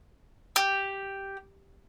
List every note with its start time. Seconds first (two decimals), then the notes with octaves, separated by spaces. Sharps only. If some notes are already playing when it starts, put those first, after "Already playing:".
0.56 G4